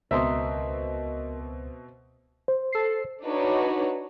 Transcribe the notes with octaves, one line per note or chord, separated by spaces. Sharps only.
C#2 B2 C4 A#4 D#5 E5 C6
C5
A4 C7
D4 D#4 F#4 B4 C#5